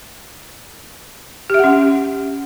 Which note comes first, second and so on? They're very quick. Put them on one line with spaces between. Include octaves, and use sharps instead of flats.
G4 E5 F#5 C#4